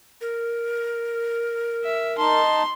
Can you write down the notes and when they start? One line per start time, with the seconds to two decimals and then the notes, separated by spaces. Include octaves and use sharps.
0.21 A#4
1.84 E5
2.19 D#4 A5 C6